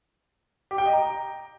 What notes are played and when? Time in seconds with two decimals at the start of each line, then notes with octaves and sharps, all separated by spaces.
0.71 G4
0.78 G5
0.86 D#5
0.93 A#5